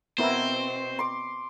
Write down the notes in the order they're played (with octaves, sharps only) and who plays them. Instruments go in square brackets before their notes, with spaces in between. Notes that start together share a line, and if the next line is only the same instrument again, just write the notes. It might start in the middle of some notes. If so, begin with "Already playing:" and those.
[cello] B2 C4 [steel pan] B3 E4 A#4 [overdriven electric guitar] C5
[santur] C6 D6